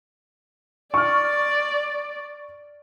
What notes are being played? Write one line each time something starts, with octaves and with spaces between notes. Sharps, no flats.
D5 C#6 F6